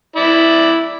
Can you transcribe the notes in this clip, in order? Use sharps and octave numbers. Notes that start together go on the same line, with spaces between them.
E4 D5